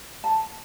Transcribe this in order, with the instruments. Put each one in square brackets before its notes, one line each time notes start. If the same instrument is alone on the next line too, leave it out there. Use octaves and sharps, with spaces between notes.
[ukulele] A5